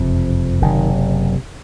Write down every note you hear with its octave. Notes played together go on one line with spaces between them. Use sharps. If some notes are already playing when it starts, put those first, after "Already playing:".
Already playing: F#1 F2 C3
F#1 C3 D#3